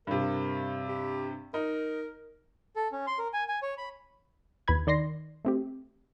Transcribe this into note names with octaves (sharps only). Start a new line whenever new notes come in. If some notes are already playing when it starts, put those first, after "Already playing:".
G2 C3 A#4
G4
D#4 A#4
A4
C#4
C6
A#4
G#5
G#5
C#5
B5
D#2 B4 B5 G#6
D#3 D5 C6 A#6 C7
A3 C4 G4